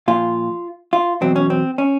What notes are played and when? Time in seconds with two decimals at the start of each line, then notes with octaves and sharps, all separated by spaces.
0.08 A#2 F3 F4
0.93 F4
1.21 E2 B2 F#3 C4
1.36 C#4
1.50 C4
1.78 C#4